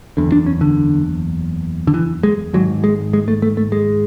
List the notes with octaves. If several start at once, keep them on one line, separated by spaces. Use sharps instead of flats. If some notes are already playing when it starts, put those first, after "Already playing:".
F#1 E2 D3
D4
C#4
D3
D3
E3
G#3
G#1 G#2 F#3
G#3
G#3
A3
A3
A3
G#3